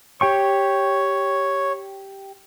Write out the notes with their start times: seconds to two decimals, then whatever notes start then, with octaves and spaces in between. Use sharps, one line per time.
0.21 G4 C#5 G5 C#6